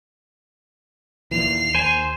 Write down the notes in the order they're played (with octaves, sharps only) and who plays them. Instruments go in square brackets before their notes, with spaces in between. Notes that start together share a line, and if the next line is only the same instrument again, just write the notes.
[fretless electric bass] D#2 A#2 E3 [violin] C7 F7
[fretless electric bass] D#2 [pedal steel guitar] C5 G#5